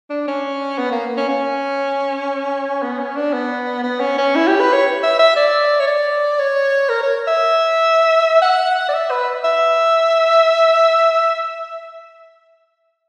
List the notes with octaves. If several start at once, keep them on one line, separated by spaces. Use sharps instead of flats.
D4
C#4
B3
A#3
C#4
C#4
B3
C#4
D4
B3
B3
C#4
C#4
E4
G4
B4
C#5
E5
E5
D5
C#5
D5
C#5
A#4
C#5
E5
F#5
D5
E5
B4
E5